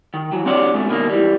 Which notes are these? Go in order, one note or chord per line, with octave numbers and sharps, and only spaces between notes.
D#3
E3 F#3
C4 D4 F#4 G4 C#5 D5
G#2 B2 A3
B2 D#3 G3 A#3
E3 G3